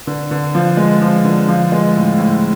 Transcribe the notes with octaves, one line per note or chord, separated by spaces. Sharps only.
D3
D3
F3
G#3
F3
D3
F3
G#3
A2
A2